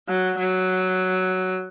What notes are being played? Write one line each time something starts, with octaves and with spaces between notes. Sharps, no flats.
F#3
F#3